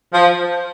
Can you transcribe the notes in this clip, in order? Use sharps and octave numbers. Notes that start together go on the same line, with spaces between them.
F3